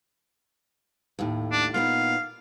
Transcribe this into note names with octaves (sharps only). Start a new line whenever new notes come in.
D#2 A2
D4
A#2 B3 D#4 F5